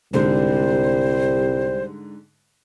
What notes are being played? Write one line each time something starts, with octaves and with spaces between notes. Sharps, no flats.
C2 G#2 D3 G3 C5